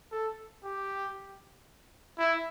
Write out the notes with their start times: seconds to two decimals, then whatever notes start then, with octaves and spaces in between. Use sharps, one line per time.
0.12 A4
0.64 G4
2.18 E4